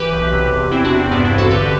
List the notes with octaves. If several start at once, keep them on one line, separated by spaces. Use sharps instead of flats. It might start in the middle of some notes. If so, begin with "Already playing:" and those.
Already playing: E3 G4 B4
B1
C3
E2
E2 C4 E4
D4 F#4
C3
C4
G2 B3 D4
C4 E4
A1
F#4 A4
D3 G4 B4